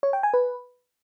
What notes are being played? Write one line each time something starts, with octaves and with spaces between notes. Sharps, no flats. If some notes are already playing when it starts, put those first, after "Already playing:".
C#5
G5
G#5
B4